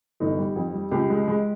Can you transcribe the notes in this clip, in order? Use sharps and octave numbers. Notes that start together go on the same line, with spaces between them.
G1 D#4
G3
F2
G3
C#2 G4
G#3
G#3